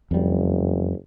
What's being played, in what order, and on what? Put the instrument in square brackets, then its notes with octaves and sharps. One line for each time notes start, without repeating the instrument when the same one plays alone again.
[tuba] F#1 [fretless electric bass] F2 G3